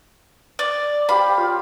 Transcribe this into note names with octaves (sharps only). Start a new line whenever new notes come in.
D5
G4 C5 F5 B5
F4 F5 G5